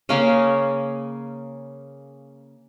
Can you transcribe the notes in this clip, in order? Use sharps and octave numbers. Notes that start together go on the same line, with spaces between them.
C#3 A#3 C#4